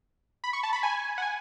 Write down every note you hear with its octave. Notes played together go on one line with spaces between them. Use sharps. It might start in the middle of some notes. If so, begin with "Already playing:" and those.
B5
C#6
A5
B5
G#5
F#5
G#5